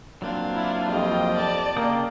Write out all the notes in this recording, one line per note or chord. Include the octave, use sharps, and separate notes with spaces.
F#3 A#3 C4 D4 F4
E4
F2 G4 D#5
D5 A5
C#3 A#3 G5 D#6